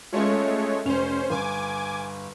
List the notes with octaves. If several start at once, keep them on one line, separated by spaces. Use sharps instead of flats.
G#3 A3 C#4 F4 C#5
F1 C#4 C5 F7
G1 G#5 D6